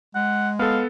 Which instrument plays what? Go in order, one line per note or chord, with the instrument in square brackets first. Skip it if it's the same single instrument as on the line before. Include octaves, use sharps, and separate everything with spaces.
[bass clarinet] G#3 [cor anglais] F#5
[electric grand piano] B3 A4 [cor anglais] F5